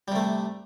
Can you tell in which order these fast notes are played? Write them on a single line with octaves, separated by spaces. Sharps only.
G3 C3 A3